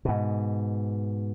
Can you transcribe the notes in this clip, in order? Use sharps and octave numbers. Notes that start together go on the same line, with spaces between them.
G#2 B2